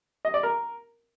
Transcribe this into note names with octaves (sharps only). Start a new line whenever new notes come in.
D#5
D5
A#4